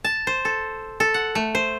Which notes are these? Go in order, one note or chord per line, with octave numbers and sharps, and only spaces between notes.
A5
C5
A4
A4
F#5
A3
C5